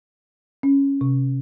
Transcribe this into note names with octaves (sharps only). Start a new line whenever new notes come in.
C#4
C3